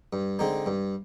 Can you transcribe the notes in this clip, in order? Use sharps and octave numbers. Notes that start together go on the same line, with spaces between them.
G2
D3 G#3 C4 D#4
G2